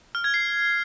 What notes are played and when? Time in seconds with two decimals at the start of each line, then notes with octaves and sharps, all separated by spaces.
0.15 F6
0.24 G#6
0.34 C7